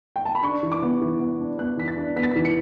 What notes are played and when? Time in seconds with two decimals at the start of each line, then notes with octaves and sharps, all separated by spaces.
0.16 G5
0.25 A5
0.35 B5
0.43 D4 C#6
0.63 E3
0.72 D6
0.82 B3
1.01 E3
1.20 B3
1.40 D4
1.58 B3 F#6
1.77 E3 B6
1.88 A6
1.97 D4
2.16 B3 B6
2.23 A6
2.31 E3 B6
2.45 C#7